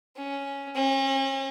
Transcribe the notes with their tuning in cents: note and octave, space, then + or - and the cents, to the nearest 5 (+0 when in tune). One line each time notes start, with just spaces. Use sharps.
C#4 +5
C#4 -45